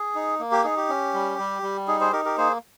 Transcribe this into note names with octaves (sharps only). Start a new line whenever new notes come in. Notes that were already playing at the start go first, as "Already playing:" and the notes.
Already playing: G#4
D#4
A#3
G4
D#4 G#4
G4
C#4
G3
G3
G3
D#4 G#4
G#4 C5
D#4 G4 A#4
G4 A#4
A#3 G#4 C5